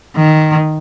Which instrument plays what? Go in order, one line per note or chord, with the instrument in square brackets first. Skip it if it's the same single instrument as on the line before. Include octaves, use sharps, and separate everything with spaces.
[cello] D#3